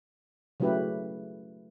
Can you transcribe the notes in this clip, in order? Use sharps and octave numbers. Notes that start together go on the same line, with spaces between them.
C#3 F#3 A3 E4 G4 B4